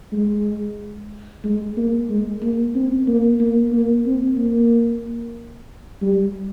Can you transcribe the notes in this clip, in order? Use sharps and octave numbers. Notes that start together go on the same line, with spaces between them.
G#3
G#3
A#3
G#3
A#3
C4
A#3
A#3
A#3
C4
A#3
G3